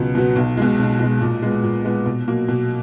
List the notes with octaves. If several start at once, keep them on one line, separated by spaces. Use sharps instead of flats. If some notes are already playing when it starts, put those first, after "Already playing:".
Already playing: C#2 B2 F#3 B3
B2 F#3 B3
B1
B2 G#3
B1
B2 G#3
A#2
G#3 B3
A#2
G#3 B3
B2
F#3 A#3
B2